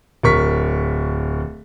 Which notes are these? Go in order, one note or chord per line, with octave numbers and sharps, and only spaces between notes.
D1 A#4 C#6 B6